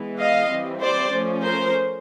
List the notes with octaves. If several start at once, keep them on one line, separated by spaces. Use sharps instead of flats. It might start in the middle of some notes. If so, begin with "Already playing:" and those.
Already playing: E3 G#3 B3
D#5 F5
E3 G3 C4
C5 D5
F3 A3 C#4
A#4 C5